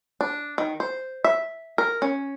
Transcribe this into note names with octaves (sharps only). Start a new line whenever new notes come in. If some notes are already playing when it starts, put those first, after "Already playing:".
D4
D#3
C5
E5
A#4
C#4